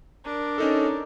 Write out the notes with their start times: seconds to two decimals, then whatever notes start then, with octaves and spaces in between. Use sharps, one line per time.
0.24 D4 A#4
0.58 C#4 D#4 A4